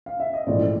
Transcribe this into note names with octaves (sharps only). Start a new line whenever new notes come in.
F5
E5
D#5
A#1 G#2 E3 A3 C4 D5